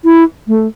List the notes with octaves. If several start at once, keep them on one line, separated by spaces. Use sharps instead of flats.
E4
A3